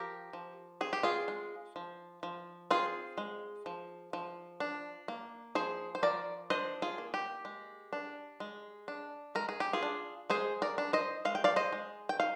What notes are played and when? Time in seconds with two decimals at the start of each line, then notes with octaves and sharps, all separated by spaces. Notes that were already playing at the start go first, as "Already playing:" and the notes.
Already playing: F3 G4 A#4
0.33 F3
0.81 C4 G#4
0.93 G4
1.03 F4 G#4
1.28 G#3
1.76 F3
2.23 F3
2.71 C4 F4 G#4
3.18 G#3
3.66 F3
4.13 F3
4.60 D4
5.08 A#3
5.55 F3 G#4 C5
5.95 C5
6.03 F3 A#4 D5
6.50 D4 C5 D#5
6.82 F4 G#4
6.98 A#3
7.14 G4
7.45 G#3
7.93 D4
8.40 G#3
8.88 D4
9.35 G#3 A#4
9.49 G#4
9.60 G4
9.73 F4 G#4
9.83 D4
10.30 G#3 G#4 C5
10.62 A#4 D5
10.78 D4
10.93 C5 D#5
11.25 G#3 F5
11.35 G5
11.44 D5 F5
11.56 C5 D#5
11.72 G#3
12.09 G5
12.20 D#4 F5